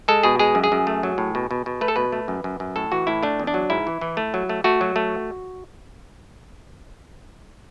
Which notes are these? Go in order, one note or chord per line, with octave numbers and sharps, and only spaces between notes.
G#3 A4
B2 G#4
G#3 G#4
F#2
G#4
F#2
A3
F#3
A2
B2
B2
B2
A3 B4
A4
B2 B4
A3
F#2
F#2
F#2
A2 A4
E3 F#4
A2 E4
A3 D4
E2
D4
F#3
G#2 E4
E3
E3
A3
F#3
A3
A3 F#4
F#3
A3